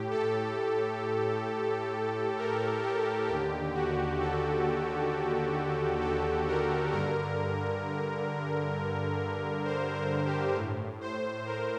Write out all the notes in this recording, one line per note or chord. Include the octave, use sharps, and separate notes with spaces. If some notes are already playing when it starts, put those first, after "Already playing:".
Already playing: A2 G4
A4
A#4
G4
D#2 D3 G4
F#4
A4
A4
A#4
G2 D3 A#4
C5
A#4
G4
A2
C5
A#4